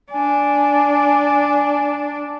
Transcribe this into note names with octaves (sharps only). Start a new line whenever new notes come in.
D4 G#5